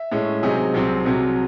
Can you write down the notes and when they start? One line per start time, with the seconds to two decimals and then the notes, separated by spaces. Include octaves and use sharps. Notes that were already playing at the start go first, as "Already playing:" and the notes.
Already playing: E5
0.12 A2 G#3 C#4
0.43 C3 F#3 C4 D#4 G#4
0.74 C2 C3 F#3 C4
1.05 C2 C3 F#3